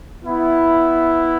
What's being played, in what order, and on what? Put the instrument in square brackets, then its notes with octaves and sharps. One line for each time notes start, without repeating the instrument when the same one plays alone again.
[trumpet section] B3 E4